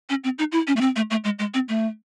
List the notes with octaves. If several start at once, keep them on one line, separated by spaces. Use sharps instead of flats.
C#4
C4
D#4
E4
C#4
A3
C4
A3
A3
G#3
G#3
C4
A3